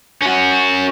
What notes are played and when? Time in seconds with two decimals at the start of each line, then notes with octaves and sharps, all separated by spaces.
0.22 C#4 F#4